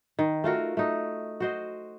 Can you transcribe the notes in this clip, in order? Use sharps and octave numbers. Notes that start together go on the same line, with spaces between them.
D#3
A3 F4 F#4 A#4
A3 D#4
F#4 C5 D#5